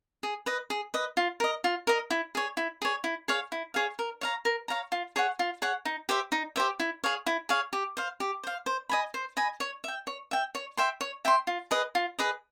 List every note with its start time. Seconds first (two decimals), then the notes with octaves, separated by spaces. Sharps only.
0.23 G#4
0.46 B4 D#5
0.70 G#4
0.94 B4 D#5
1.17 F4
1.40 A#4 D#5
1.64 F4
1.87 A#4 D#5
2.10 E4
2.35 G#4 C#5
2.57 E4
2.82 G#4 C#5
3.04 E4
3.28 G#4 C#5 F5
3.52 E4
3.74 G#4 C#5 F5
3.99 A#4
4.21 C#5 F5 A#5
4.45 A#4
4.68 C#5 F5 A#5
4.92 F4
5.16 G#4 C#5 F#5
5.39 F4
5.62 G#4 C#5 F#5
5.85 D#4
6.09 G4 C5 E5
6.32 D#4
6.56 G4 C5 E5
6.80 E4
7.04 G#4 C#5 F5
7.26 E4
7.49 G#4 C#5 F5
7.73 G4
7.97 C5 F5
8.20 G4
8.44 C5 F5
8.66 C5
8.89 D#5 G#5 B5
9.14 C5
9.37 D#5 G#5 B5
9.60 C#5
9.84 E5 G5
10.07 C#5
10.31 E5 G5
10.55 C#5
10.77 E5 G5 C6
11.01 C#5
11.25 E5 G5 C6
11.47 F4
11.71 G#4 B4 D#5
11.95 F4
12.19 G#4 B4 D#5